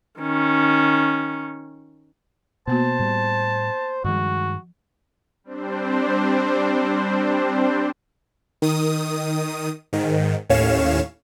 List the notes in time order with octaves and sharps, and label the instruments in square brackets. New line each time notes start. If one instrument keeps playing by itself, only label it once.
[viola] D#3 C#4
[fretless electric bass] B2 [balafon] A#3 B3 F#4 [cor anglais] C5 [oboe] A5
[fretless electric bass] A2 G3
[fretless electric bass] G2 D#3 G#3 [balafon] F3 [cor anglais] F#4
[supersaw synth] G3 C4 D4 C5
D#3 D#6
G#2 D#3
D#2 A2 C#4 C#5 F5 E7